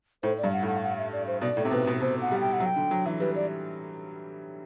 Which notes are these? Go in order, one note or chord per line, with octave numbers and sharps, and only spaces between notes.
A2 C5
D5
G2
F#5
A2
F#5
F#5
E5
D5
C5
B2 D5
A2
C3
B2 B4
B2
B2 C5
F#5
G3
G5
F#5
F#3
G5
D3
F#3
E3
G3 B4
D5